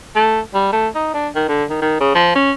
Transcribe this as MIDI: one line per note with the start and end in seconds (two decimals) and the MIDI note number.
0.15 0.40 57
0.54 0.69 55
0.72 0.88 57
0.95 1.10 63
1.14 1.28 62
1.35 1.47 51
1.48 1.64 50
1.70 1.77 51
1.81 1.95 51
2.00 2.13 49
2.15 2.34 53
2.35 2.51 61